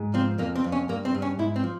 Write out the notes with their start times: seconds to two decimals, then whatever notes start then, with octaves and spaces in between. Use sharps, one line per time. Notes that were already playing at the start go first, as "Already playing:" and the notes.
Already playing: G#2
0.14 F3 C4
0.38 F2 A#3
0.56 C4
0.64 F2
0.72 C#4
0.89 G2 A#3
1.05 C4
1.15 G2
1.22 C#4
1.39 G#2 E4
1.56 C4
1.64 F3